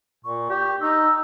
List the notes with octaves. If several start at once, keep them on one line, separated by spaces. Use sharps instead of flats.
A#2 C#6
G4
D#4 E6